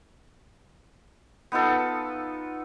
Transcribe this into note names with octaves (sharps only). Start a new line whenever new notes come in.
B3 D#4 F4 A4